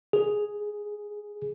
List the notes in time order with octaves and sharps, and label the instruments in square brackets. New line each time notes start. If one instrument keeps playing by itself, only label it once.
[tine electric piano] G#4